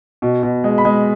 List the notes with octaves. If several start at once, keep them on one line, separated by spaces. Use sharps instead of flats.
B2
B2
G#3
B5
G#3